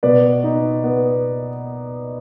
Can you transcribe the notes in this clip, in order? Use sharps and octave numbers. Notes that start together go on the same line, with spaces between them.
B2 B4 D5
D#4
B3